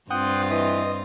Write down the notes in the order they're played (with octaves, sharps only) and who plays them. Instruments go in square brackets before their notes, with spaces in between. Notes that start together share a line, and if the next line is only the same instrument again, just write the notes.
[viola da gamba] G2 C4 F4 [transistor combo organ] F#5 G5 D#6
[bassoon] E3 [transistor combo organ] D#5